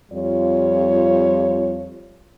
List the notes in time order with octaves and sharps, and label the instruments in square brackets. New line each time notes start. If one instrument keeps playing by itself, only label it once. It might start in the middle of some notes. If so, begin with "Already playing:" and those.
[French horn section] F2 G3 F4 C#5